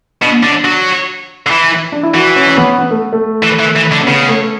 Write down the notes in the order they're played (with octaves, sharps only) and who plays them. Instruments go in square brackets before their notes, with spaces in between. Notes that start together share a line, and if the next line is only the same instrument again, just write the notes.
[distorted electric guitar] B2 [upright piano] D4
[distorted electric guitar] D3 [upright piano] D4
[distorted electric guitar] F#3
D3
E3
[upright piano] D4
E4
[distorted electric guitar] E3 [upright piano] F#4
[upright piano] C#4
C#4
B3
B3
A3
A3
[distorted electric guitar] E3
E3
E3
D3
[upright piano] C#4
[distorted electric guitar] C#3 [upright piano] B3
[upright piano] A3